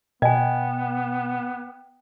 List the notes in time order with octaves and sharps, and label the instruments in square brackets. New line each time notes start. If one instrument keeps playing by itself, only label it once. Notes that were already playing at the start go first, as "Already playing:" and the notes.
[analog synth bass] B2 [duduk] B3 [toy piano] D#5 G#5 [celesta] G5